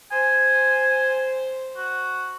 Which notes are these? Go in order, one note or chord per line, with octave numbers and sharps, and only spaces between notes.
C5 G#5
F#4